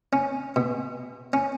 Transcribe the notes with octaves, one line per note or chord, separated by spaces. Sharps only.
C#4
B2
C#4